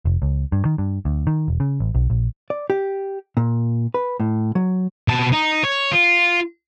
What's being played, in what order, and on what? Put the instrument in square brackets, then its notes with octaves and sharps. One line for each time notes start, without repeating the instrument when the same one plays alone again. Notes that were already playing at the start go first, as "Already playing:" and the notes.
[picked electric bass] F1
C#2
G2
D#3
G2
D2
D#3
E1
C#3
A1
B1
A#1
[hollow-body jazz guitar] D5
G4
A#2
B4
A2
F#3
[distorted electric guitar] B2 A5
D#4
C#5
F4